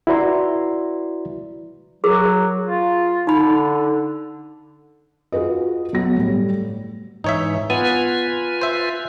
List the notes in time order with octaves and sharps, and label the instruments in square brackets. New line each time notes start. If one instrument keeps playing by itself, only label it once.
[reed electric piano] E4 F#4 B4 D5 A#5 C6
[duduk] F#3 [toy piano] G#4 A#4
[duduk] F4
[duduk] D3 [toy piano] D#4 B5
[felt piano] F4 F#4 G#4 B4 D#5
B1 F#3 A#6
G1 A2 G3
[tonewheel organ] G#2 E3 [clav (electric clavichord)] D#4 C#5 E5
[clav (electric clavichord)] B3 [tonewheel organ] F4 B4 G#5
[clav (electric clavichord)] C5 E5